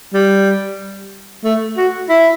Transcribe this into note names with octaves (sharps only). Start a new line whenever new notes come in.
G3
A3
F#4
E4